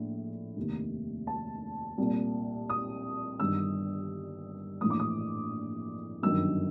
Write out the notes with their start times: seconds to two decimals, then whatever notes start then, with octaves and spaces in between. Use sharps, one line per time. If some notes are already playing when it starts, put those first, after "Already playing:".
Already playing: A#1 A2
0.57 F1 D#2 D#3
1.27 A5
1.98 C2 A#2
2.70 D#6
3.40 G1 G2 D#3 E6
4.81 A#1 A2 E3 D#6
4.90 D6
5.00 D#6
6.22 G1 F#2 D#3 E6